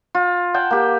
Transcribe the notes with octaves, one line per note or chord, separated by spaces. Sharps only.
F4
F#5 G5 A5
A#3 G4